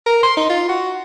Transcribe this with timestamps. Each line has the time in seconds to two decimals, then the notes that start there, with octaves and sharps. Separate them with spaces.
0.07 A#4
0.23 C6
0.37 D#4
0.50 F4
0.69 F#4